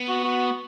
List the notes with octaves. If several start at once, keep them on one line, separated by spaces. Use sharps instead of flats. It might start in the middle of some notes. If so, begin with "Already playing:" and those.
Already playing: B3
F#4
F#4